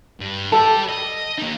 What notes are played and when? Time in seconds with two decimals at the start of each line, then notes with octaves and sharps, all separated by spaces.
0.20 G2
0.52 G4 A4 D5
0.90 D#5
1.39 A#3 D#4